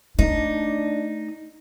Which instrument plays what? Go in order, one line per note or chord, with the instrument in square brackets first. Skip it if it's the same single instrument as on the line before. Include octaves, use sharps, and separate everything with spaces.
[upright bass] A3 [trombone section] D4 [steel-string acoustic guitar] D#4